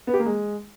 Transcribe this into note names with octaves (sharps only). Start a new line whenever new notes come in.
B3
G4
A#3
G#3